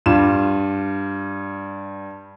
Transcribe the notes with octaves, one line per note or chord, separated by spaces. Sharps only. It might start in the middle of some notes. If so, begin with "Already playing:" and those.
G2 F4 E7